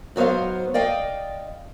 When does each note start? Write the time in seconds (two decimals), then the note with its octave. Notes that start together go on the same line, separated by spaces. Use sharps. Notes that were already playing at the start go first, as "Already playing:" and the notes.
0.16 G#2 F#3 B3 C5 F5
0.74 D5 D#5 F5 G5